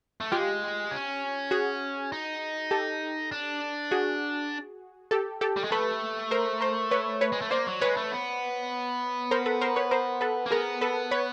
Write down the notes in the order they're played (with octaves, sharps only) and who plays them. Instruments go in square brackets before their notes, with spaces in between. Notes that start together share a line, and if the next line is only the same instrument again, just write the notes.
[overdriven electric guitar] A3
[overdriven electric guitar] G#3 [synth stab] F4 G4
[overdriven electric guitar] C#4
[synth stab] F#4 G#4
[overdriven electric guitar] D#4
[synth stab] G4 A4
[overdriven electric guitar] D4
[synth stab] F#4 G#4
G4 A4
G4 A4
[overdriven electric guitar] G3
G#3
[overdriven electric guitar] A3 [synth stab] A4 B4
[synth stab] A#4 C5
A#4 C5
B4 C#5
B4 C#5
[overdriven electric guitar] G#3
A3
[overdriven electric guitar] A#3 [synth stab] C5 D5
[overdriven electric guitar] F#3
[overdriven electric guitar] G#3 [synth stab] B4 C#5
[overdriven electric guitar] A3
B3
[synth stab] A#4 C5
A4 B4
A#4 C5
B4 C#5
A#4 C5
A4 B4
[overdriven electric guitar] A#3
[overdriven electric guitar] B3 [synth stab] G#4 A#4
[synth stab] A4 B4
B4 C#5